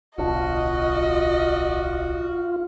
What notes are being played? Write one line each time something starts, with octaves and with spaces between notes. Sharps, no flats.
D1 B1 D4 F4 F#4 D#5